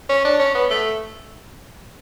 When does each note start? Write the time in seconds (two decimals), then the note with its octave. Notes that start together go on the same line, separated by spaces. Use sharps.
0.09 C#4
0.25 D4
0.39 C#4
0.54 B3
0.70 A3